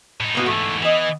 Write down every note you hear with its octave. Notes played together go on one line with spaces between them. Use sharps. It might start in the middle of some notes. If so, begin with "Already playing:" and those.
A2 D#4
A#3 B3 F#4
G#2 E3 A3
E3 B3 D#5